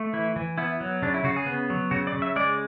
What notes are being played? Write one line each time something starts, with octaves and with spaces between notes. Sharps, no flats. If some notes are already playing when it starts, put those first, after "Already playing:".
Already playing: A3
E3 E4
E3
B3 E4
F#3
C#3 D4
E4
C#3 F#4
G#4
B3
F#3
C#3 F#4
D5
C#3
E5
G#3 D5